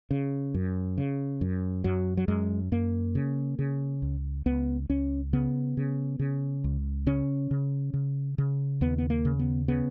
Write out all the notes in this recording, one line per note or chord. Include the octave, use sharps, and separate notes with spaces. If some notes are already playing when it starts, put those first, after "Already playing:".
C#3
F#2
C#3
F#2
F#2 F#3
F#3
F#2 G#3
F#2 A#3
C#3
C#3
C#2
C#2 B3
C#2 C#4
C#3 B3
C#3
C#3
C#2
C#3 C#4
C#3
C#3
C#3
D#2 B3
B3
A#3
C#3
B3
C#3 B3